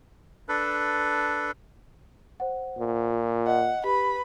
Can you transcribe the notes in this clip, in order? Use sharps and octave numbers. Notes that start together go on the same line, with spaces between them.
D4 A4 B4
C5 F#5
A#2
F4
D#5 F#5
G4 B4 B5